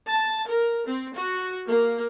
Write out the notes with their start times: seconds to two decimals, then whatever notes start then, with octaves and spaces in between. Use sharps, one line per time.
0.10 A5
0.48 A#4
0.87 C4
1.17 F#4
1.67 A#3